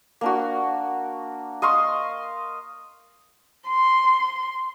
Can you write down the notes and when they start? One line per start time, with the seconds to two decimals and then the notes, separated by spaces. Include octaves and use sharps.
0.21 A#3 D4 F#4
1.62 D#5 F5 C6 C#6
3.67 C6